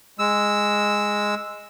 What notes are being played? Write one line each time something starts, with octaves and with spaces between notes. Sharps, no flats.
G#3 E6